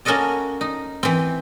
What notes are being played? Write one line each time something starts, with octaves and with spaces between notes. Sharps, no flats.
A#3 C#4 F#4 A4 D#5 A5
D#4
E3 C4